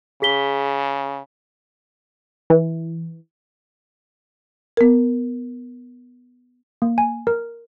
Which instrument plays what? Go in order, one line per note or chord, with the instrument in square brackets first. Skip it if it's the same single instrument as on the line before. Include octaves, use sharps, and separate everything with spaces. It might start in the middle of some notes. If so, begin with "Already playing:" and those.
[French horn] C#3 [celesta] G#4 B6 G7
[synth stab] E3
[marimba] B3 A#4
[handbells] A#3
G#5
A#4